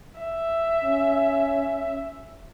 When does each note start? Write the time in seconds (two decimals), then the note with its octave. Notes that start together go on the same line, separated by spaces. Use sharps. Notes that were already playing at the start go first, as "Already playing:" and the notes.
0.20 E5
0.84 C#4